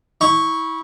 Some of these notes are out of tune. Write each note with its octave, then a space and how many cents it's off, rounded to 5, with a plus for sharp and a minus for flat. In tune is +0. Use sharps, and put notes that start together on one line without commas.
E4 -25 C#6 +0